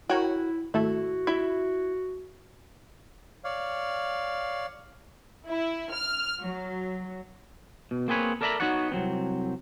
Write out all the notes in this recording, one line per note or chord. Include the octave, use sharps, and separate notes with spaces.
E4 F#4 A#4 C#5 G5
G#1 A3 E4 F#4 A4
E4 E5
C#5 D5 F5
E4
F6
F#3
B2
A#3 C4 G#4 B4 C#5
A4 A#4 D5 E5 A#5 B5
B3 D#4 F#4 C#5 D5 F#5
C2 F#3 C4